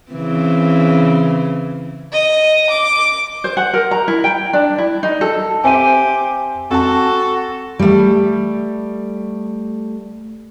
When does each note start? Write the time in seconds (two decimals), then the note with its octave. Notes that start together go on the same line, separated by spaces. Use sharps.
0.12 C#3 E3 C4
2.12 D#5
2.70 D6
3.44 C5
3.57 F#5
3.74 A#4
3.91 A#5
4.08 E4
4.24 G5
4.53 D4
4.78 E4
5.03 D#4
5.21 A4
5.64 C4 G4 C5 E5 G#5 D#7
6.71 C4 F#4 A4 A5
7.79 G3 A3